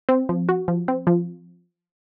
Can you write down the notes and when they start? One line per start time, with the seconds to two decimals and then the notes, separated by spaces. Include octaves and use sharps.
0.09 C4
0.29 F3
0.49 F#4
0.68 F3
0.88 C4
1.07 F3